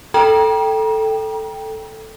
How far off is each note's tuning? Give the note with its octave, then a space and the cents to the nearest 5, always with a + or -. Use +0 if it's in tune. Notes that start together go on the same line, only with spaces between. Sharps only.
A4 +0 G5 +0 A#5 +35